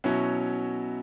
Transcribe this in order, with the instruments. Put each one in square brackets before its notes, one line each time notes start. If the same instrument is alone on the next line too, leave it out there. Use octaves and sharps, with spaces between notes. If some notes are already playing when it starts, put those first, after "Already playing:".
[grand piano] B2 F#3 C#4 E4